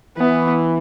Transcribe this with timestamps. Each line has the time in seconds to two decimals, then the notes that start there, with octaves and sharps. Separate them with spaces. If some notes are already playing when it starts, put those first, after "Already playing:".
0.17 E3 B3